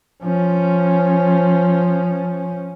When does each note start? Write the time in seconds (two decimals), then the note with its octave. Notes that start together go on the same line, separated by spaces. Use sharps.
0.23 F3 C#4